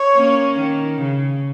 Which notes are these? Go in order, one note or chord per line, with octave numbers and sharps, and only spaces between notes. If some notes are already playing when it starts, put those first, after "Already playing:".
Already playing: C#5
A#3 C#4
D#3
C#3